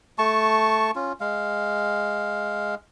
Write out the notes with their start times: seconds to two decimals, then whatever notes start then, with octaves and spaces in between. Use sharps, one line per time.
0.18 A3 A5 C#6
0.95 C#4 F4
1.20 G#3 F5